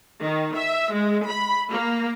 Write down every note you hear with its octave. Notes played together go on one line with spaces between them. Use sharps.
D#3
E5
G#3
B5
A#3